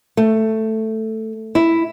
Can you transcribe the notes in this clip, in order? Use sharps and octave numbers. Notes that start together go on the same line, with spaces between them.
A3
E4